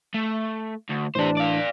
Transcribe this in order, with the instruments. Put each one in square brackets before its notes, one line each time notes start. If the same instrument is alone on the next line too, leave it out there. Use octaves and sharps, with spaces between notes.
[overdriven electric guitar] A3
D2
[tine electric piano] A2 E3 D4 [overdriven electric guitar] G4 C5
[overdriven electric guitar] D5 F5